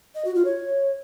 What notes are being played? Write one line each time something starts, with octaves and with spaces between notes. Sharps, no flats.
D#5
F#4
F4
C#5